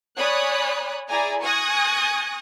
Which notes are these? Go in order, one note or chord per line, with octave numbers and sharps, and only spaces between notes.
C#5 D5 G#5 B5 D#6 F#6
E4 G#4 D5 G#5 A#5
G#5 C#6 D#6 F#6 G#6 A#6